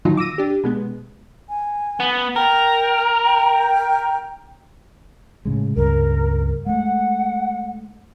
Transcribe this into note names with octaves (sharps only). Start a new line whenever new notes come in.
A#2 D3 D#3 F#3 D#4 F4
D6 E6 A#6 D#7
D4 G4
B2 G#3 B3
G#5
B3
A#4 G5
G5
A2 C#3 G#3
C#2 G2 C#3 A#4
G#3 A3 F#5